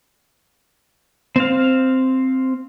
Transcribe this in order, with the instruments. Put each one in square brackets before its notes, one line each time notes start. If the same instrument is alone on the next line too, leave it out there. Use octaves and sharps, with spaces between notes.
[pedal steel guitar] C4 F5